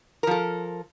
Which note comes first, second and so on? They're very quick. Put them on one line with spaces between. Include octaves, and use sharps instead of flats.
A#4 F3 A4